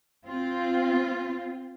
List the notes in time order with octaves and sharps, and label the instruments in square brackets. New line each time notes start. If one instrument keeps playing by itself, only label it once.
[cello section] C4 F4